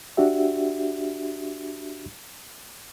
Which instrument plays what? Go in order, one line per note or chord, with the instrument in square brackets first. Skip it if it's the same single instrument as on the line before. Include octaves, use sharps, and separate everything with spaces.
[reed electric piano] D4 F#4 G4 E5